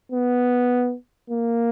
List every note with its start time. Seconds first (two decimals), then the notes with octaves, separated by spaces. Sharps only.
0.12 B3
1.30 A#3